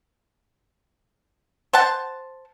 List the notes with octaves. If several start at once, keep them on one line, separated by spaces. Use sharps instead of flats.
C5 F#5 A5